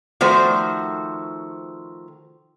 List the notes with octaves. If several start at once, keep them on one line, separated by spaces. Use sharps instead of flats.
D#3 F3 A3 F#4 C5